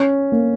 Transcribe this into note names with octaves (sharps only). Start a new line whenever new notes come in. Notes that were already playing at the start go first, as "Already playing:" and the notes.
Already playing: C#4
A#3